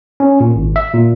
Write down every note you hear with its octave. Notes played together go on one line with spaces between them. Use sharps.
C#4
A#2
G#1
E5
A#2